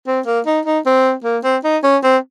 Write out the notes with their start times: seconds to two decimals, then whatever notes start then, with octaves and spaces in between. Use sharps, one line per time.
0.07 C4
0.26 A#3
0.47 D#4
0.66 D#4
0.86 C4
1.24 A#3
1.44 C4
1.64 D#4
1.84 C#4
2.04 C4